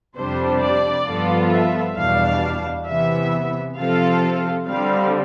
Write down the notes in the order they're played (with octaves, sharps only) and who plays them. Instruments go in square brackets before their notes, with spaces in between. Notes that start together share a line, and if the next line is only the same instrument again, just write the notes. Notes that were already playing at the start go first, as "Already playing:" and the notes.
[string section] F2 C3 G3 D4 [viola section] C5
[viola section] D5
[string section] G2 F3 B3 F4 A4
[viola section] E5
[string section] E2 B2 G3 D4 [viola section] F5
[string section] C3 E3 B3 [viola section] E5
[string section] C3 F3 C4 F4 A4 [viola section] F5
[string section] D3 G3 C4 [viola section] F5